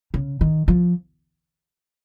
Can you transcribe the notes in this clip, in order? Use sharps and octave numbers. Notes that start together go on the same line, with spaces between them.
C#3
D#3
F3